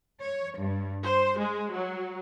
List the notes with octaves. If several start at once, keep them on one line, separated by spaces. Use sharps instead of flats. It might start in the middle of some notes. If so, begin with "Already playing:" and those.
C#5
G2
C5
G#3
F#3